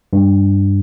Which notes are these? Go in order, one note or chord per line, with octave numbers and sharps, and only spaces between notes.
G2